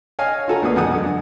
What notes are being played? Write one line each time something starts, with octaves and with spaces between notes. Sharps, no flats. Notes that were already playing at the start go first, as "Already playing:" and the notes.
C#5 D#5 F5 G#5
F4 F#4 A4 A#4 G#5 A#5
D2 A#3 B3 B4 D#6
F2 B2 F#5 G#5 D#6
F#2 D3